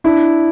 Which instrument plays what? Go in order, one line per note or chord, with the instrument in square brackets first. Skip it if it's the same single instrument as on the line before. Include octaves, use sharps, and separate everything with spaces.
[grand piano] D4 E4